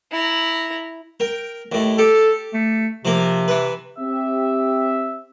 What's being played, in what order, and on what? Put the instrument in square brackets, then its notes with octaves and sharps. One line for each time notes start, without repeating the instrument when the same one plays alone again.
[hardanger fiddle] E4 A#5
[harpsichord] A#4 G5
D#2 A2
[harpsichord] G4 [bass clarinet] A4
[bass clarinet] A3
[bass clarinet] C3 [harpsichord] F3 A#3
[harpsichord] E3 B4
[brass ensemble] C4 G4 E5